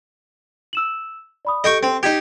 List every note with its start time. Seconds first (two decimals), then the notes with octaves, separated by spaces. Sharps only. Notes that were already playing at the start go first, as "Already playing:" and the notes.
0.73 E6 E7 F#7
1.45 D5 B5 D#6
1.64 G4 A4 D#5 G5 C#6
1.83 C4
2.03 D#4 G4 G6 G#6 B6